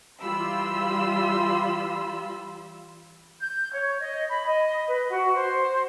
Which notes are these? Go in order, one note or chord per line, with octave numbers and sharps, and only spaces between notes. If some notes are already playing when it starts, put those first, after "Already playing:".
E3 G3 F4 B5 C6 E6
G6
C#5
D#5
B5
D#5
B4
F#4
C5